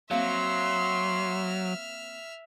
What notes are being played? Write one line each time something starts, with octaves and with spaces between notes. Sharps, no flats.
F#3 A#3 C4 E5 F5 C6 F6